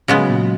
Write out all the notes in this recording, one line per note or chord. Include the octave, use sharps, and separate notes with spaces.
C#3 F#3 G#3 B3
F#3
A#2